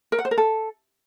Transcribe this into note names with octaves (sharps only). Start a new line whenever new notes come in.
A#4
F#5
C5
A#4
A4